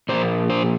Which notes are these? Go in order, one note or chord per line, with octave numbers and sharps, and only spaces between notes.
A#2 F3 C5
C5